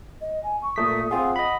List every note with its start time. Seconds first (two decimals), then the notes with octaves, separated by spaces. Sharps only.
0.21 D#5
0.43 G#5
0.62 C#6
0.76 A#2 A3 D#6 B6
1.11 C4 F4 G#4 F#5
1.36 D#5 B5